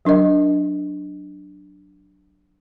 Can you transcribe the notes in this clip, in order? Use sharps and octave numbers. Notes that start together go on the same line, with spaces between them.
F#3 D4 A#4 D#5